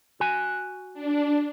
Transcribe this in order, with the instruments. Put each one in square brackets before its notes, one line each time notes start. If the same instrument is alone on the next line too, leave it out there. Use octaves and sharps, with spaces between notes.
[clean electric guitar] F#4 G#5
[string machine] D4